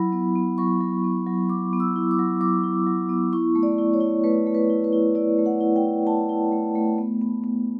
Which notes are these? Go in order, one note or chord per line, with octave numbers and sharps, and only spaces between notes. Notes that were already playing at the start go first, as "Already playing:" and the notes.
Already playing: F#3 E4 B5
B3
B3
F#3 C#6
F#3
B3
F#3
F#3 D6
B3
E6
E4
D6
F#3
F#3 D6
E4
F#3
B3
E4 C#6
A3
D5
E4
C#5
E4
A3 B4
A3
B4
E4
B4
E4
E4 D5
A3
F#5
E4
G5
E4
E4 A5
E4
A3
A3
B3
B3
B3